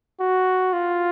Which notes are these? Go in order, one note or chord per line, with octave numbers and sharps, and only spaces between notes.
F#4
F4